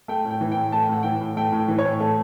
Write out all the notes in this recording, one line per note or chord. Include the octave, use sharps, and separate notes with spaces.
A3 G5
A2
G5
E3
G5
A2
A3 A5
G5
A2 F#5
E3 G5
A2
A3 G5
A2
G5
E3
C#5
A2
A3 A4